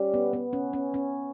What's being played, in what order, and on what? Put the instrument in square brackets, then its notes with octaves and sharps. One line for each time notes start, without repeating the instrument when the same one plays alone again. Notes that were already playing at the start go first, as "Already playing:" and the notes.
Already playing: [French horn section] G3 C#4 G4 D5
[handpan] B3
B3
C#4
C#4
C#4